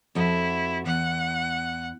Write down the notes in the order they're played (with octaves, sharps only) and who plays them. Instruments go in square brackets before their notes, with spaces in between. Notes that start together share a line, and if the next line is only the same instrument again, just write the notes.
[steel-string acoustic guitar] F2 F#4 [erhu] E4
[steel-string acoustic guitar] E2 [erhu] F#5